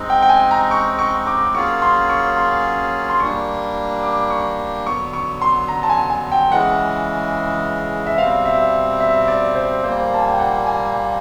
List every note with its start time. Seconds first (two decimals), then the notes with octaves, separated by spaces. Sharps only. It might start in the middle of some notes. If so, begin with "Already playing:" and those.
Already playing: G#3 C4 D#4
0.10 G5
0.22 G5
0.29 G#5
0.51 A#5
0.71 C#6
0.99 C#6
1.27 D6
1.54 F#3 A#3 C#4 F4 G#4 C#6
1.82 C6
2.10 C#6
2.37 C6
3.10 C6
3.20 G3 A#3 D4 C#6
4.03 D6
4.30 C#6
4.86 D3 F#3 B3 C#6
5.13 C#6
5.42 C6
5.68 A#5
5.83 A5
5.90 G#5
6.10 G#5
6.32 G5
6.51 C#3 E3 G#3 F#5
8.07 E5
8.18 B2 G3 C4 F5
8.45 E5
9.00 E5
9.28 D5
9.55 C5
9.83 A#2 G3 A#3 C5
10.14 A5
10.21 G#5
10.31 G5
10.39 F#5
10.66 G#5